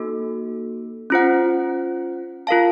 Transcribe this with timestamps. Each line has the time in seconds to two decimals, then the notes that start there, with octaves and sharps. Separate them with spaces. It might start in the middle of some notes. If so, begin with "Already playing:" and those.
Already playing: A#3 D#4 F#4 A4
1.10 C#4 F4 C5 F#5
2.47 F4 A#4 F5 A5